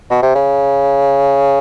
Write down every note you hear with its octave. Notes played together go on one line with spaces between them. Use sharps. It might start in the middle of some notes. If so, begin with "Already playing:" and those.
B2
C3
C#3